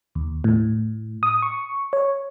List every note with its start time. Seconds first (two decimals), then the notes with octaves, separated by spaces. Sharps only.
0.15 D#2
0.44 A2
1.23 D#6
1.42 C#6
1.93 C#5